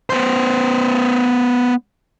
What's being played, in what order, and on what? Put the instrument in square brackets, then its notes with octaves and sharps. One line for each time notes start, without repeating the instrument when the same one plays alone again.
[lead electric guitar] B3 C5